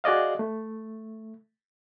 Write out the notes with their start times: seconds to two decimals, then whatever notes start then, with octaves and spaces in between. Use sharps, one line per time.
0.04 F#4 G#4 D5 D#5 F5
0.39 A3